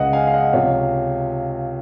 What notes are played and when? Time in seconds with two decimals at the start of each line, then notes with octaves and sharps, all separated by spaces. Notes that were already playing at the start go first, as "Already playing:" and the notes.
Already playing: C#2 C#3 G#3 D#5 F#5
0.13 F5 G#5
0.27 F5
0.33 D#5 F#5
0.53 C#2 C3 F3 C#5 F5